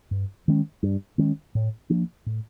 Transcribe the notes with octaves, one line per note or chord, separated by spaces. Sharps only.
G2
D#3 G#3 C#4
G2
D#3 G#3 C#4
A2
F3 A#3 D4
A2